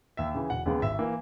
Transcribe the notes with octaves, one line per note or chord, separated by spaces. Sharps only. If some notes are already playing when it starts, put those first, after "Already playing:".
D#2 E5
C#3 E3
E1 F#5
D#2 C#3 G#3 B3
G#1 E5
E3 A#3